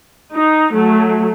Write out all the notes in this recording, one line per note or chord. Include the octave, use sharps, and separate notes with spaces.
D#4
F#3 A3